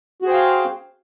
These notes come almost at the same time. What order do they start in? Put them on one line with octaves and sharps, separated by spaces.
F#4 G#4 C5 G5 F5